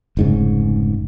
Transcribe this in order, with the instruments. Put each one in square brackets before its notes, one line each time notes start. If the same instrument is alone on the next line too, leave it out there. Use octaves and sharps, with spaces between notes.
[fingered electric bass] F1 G#2 C#3